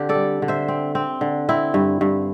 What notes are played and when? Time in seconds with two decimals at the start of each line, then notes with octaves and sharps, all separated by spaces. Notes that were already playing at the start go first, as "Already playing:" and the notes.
Already playing: D3 C4 G4
0.09 A4 D5
0.15 G3
0.42 D3
0.48 C5 E5
0.68 C4
0.95 C4
1.21 D3
1.49 C4 E4
1.74 G2
2.01 G2